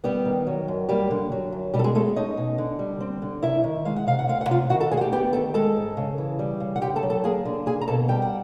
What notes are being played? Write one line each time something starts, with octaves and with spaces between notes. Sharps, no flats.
G3 B3 G4
D#3
F#3
F#2
G3 A#3 G4
D3
F#3
F#2
B2 G3 G4
A4
G#3 G#4
G#3 A3 A4
C#4 D#4 D#5
B2
D3
G3
C4
D3
C3 E4 E5
D#3
G#3 F5
F#5
C3 F5
F#5
D2 F5
F#5
C3 F4 F5
D#3 F#4 F#5
A4 A5
D2 G#4 G#5
F#5
G4 G5
B3 G4 G5
D#3 A4 A5
G#3 A4 A5
G#2
C#3
E3
G3
C#3
F#5
D3 G4 G5
A4 A5
F#3
A4 A5
A#3 G#4 G#5
D3
A#3 G#4 G#5
A#5
B2 A4 A5
G3 G5
F#5